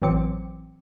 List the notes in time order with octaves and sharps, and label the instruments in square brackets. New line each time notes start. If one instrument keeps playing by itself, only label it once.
[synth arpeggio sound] A1 E3 F#3 C4 D6 C#7